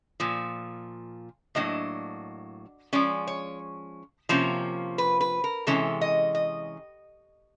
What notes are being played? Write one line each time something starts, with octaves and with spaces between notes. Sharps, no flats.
A#2 F3
A2 F#3 A#3 D4 D#5
F3 G#3 C#4 D5
C#5
C3 F3 A#3 C#4
B4
B4
A#4
C3 E3 G#3 C#4 A4
D#5
D#5